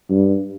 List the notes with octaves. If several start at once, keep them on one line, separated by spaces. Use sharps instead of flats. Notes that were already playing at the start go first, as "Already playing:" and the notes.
G2